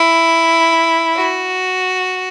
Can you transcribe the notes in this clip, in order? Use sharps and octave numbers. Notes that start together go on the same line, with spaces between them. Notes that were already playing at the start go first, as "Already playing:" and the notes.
Already playing: E4
F#4